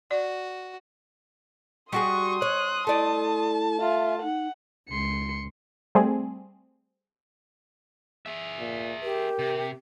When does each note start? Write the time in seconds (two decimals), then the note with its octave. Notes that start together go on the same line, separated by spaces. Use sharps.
0.11 F#4 D5
1.93 G3 F#4 G#4 C6 C#6 D#6
2.42 C#5 F#6
2.87 A3 E4 D5 A5
3.81 F4 E5
4.22 D#4 F#5
4.90 C#2 C6 C#7
5.95 G3 A3 C4 G#4
8.26 G#4 E5
8.59 A#2
9.03 G4 A#4
9.39 C3